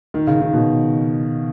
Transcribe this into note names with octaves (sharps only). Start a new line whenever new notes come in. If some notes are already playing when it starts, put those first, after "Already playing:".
D#3
C#3
D#3
B2